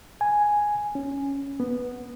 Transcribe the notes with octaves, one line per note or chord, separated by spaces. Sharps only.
G#5
C#4
B3